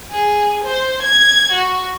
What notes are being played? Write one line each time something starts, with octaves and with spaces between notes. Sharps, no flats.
G#4
C5
G#6
F#4